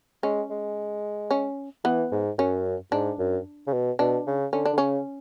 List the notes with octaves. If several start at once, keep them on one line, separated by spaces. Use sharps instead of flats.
G#3 C#4
G#3
C#4
E3 B3
G#2
F#2 C#4
G#2 D4
F#2
C#3
B2
B2 D4
C#3
D3 C#4
D4
D3
C#3 C#4